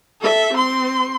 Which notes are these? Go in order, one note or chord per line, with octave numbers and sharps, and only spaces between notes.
A4 E5
C4 C6